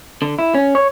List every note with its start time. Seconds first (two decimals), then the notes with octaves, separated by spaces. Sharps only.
0.22 D3
0.39 E4
0.55 C#4
0.75 C#5